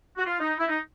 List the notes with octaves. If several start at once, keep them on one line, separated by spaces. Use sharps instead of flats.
F#4
F4
D#4
E4
D#4